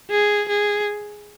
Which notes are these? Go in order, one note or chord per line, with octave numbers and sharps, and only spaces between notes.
G#4
G#4